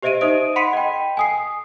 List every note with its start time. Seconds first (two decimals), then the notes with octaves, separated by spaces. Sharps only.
0.02 G4 C5 D#5 E5 D7 D#7
0.21 D#4 C5 D#5 D#6 D7
0.56 F#5 B5 C6 B6 C#7 D#7
0.73 D#5 G5
1.17 G#5 D#6 C7